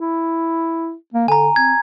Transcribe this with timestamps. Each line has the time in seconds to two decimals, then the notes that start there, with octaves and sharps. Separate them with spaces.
0.01 E4
1.14 A#3
1.28 D3 G#5 A#5
1.56 C4 G#6